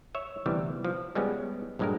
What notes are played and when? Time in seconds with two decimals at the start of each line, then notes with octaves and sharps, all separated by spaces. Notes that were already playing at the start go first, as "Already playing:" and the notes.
0.15 C#5 E5
0.46 D2 C3 E3 G3 B3
0.85 F3
1.15 G3 G#3 B3 C#4
1.79 A#1 G2 F#3 G#3 A3 A#4